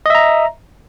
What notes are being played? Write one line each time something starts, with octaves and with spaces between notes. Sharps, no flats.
D#5 E5 A#5